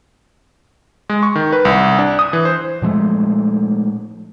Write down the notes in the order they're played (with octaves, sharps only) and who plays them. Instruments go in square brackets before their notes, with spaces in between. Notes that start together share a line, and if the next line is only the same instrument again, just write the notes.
[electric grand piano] G#3
C#6
D#3
B4
C2
D4
D#6
E3
C5
[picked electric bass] A#2 F3 G#3 A3